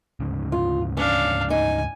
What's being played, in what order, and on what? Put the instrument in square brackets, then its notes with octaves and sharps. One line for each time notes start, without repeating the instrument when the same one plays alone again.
[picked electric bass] D2 G#2 C#3
[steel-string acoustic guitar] F4
[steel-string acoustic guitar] C#4 [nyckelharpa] D4 F5
[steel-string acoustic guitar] D#4 [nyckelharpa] G#5